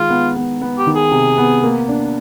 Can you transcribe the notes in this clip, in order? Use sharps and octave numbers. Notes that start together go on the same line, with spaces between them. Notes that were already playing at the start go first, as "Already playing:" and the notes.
Already playing: D#3 G#3 F4
B3
B3
B3
G4
D#3
G#4
C3
B3
A#3
D4